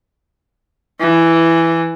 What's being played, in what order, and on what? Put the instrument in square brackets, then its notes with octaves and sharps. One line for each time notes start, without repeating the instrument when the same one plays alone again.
[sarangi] E3